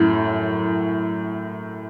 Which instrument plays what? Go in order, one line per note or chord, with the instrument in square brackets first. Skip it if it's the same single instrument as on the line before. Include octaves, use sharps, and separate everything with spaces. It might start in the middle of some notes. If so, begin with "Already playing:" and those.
Already playing: [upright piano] F#2 A2